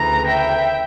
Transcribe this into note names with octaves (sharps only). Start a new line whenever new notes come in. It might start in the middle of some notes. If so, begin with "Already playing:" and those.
Already playing: D2 C#3 E3 A#5
E5 G5